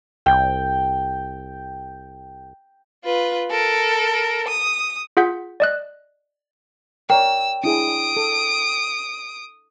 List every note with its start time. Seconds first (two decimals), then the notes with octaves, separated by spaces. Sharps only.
0.26 C2 G5
3.05 F4 B4
3.51 A4 A#4
4.47 D#6
5.17 F4 G#4 F#5 G6 B6
5.60 D5 D#5 F#6
7.10 A#4 C#5 D5 G5 E6
7.64 D4 E4 G#4 D#6 D7
8.17 A4